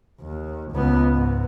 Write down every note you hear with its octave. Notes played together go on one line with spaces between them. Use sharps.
D#2
C#2 B3
G#2